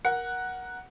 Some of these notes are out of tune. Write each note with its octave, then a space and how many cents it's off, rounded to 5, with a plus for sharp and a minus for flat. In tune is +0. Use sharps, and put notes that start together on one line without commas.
A#4 +15 F#5 +0